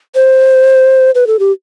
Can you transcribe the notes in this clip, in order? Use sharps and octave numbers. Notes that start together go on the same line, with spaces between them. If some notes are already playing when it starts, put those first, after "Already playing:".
C5
B4
A4
G4